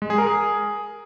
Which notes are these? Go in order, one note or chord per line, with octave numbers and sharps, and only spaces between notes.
G#3
G#4
A#4
G#4